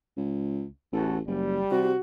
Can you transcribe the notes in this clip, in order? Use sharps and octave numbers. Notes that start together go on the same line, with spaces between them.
C#2
A1 E2 F#4 A4
F#1 G3
C3 F#4